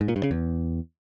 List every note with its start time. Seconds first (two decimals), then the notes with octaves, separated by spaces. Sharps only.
0.01 G#2
0.08 A#2
0.16 G2
0.23 C#3
0.31 E2